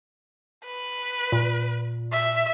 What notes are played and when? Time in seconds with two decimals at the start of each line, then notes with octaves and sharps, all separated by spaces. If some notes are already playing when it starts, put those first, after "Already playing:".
0.65 B4
1.32 A#2
2.13 E5